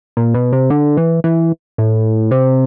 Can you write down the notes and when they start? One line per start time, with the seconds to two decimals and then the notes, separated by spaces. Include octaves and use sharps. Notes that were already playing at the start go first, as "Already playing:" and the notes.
0.17 A#2
0.34 B2
0.53 C3
0.70 D3
0.97 E3
1.24 E3
1.78 A2
2.31 C3